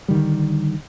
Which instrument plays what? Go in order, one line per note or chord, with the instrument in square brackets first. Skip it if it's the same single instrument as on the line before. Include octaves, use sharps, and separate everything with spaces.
[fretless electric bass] D3 D#3 G3